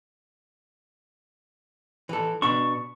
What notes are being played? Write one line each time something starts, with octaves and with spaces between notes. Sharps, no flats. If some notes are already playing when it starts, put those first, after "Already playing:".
E3 A4
B2 D4 C#6